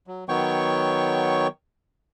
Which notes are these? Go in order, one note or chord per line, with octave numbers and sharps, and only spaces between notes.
F#3
D#3 F#3 B3 C#5 G5 C#6